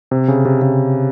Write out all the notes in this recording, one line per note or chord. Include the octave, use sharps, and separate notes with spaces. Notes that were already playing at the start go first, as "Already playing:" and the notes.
C3
C#3
C3
C#3